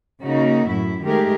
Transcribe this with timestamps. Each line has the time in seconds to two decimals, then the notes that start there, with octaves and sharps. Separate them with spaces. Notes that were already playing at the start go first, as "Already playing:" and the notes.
0.22 C#3 A#3 D#4 F#4
0.69 F#2 A2 E4
1.04 D#3 G#3 A3 G4 G#4 A#4